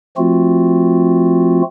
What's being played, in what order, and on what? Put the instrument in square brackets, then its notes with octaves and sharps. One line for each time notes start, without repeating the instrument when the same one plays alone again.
[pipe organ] F3 A3 C4 F4 F#4